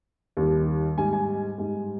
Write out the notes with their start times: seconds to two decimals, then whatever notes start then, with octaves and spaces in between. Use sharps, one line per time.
0.37 D#2 D#3 G3
0.97 G#2 G3 G#5
1.13 G#5
1.58 G#2 G3